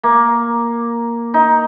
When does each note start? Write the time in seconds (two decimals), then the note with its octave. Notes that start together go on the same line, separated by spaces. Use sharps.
0.03 A#3
1.34 D#4